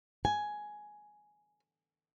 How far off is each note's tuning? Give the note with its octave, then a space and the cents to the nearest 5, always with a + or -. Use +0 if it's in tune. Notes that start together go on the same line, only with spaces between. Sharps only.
G#5 +10